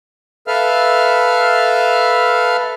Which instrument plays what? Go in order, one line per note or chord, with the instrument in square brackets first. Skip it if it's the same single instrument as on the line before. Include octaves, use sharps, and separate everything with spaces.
[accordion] A4 B4 E5 F5 F6